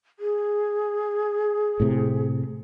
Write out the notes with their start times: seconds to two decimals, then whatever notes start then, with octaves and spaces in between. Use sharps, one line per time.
0.20 G#4
1.80 A2 C3